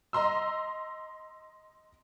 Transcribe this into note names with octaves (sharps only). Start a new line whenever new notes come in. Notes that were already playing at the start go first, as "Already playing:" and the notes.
D#5 A#5 C6 E6